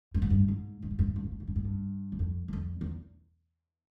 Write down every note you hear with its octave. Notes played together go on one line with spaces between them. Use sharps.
G2
G#2
G2
G#2
G2
G#2
G2
G#2
G2
G#2
G2
G#2
G2
G#2
G2
E2
F2
E2
F2
E2